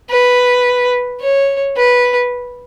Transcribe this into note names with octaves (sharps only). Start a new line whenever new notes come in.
B4
C#5
B4